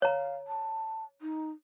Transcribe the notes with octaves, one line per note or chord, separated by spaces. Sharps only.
C#5 F5 A#5
A5
D#4